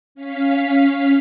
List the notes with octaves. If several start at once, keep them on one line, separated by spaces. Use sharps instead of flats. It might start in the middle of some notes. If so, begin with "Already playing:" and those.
C#4 F5 B6